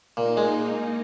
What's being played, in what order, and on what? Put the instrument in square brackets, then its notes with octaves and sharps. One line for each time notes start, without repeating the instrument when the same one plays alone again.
[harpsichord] A#2 [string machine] A#3 D#4
[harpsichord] G#3